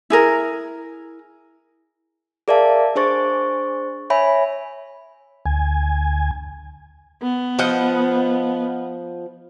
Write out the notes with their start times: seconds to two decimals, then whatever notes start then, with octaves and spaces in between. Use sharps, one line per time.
0.10 E4 G#4 A#4
2.48 G#4 A#4 D5 E5 F5 A5
2.95 D4 G#4 C5 C#6 A6
4.10 C#5 E5 G#5 B5
5.46 D2 G#5
7.23 B3
7.59 F3 D#5 F#5